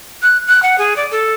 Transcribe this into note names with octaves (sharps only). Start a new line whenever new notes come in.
F#6
F#6
F#5
G#4
D5
A4